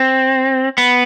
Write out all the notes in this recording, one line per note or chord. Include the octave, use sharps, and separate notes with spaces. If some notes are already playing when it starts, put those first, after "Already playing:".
Already playing: C4
B3